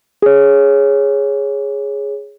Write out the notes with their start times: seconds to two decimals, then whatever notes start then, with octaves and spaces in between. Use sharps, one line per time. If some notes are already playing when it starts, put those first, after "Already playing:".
0.22 G#4 C#5